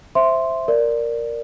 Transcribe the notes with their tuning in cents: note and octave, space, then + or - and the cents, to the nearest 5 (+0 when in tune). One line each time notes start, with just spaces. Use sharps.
C5 +5 E5 +5 C6 +0
A#4 +0 D5 +0